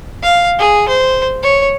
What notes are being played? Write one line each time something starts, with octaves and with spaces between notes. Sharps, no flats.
F5
G#4
C5
C#5